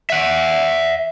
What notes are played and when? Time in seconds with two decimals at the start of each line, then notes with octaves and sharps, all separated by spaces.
0.10 E5 F#5